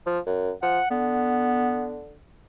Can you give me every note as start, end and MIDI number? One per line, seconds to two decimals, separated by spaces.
0.06 0.19 53
0.27 0.52 42
0.62 0.79 53
0.62 0.90 78
0.90 2.18 50
0.90 2.00 59